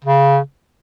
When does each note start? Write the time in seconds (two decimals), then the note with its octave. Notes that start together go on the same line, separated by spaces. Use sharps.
0.05 C#3